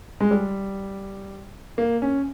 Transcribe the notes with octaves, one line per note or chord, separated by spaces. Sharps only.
G#3
G3
A#3
C#4